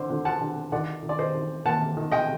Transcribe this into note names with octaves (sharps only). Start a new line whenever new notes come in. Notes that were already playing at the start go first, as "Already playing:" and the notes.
Already playing: D3 C5
D3
F#5 A5
D3
D#3 D5 F#5
D#3
D5
C5 D#5
D#3
A#3 F#5 A5
D#3
D#5 G5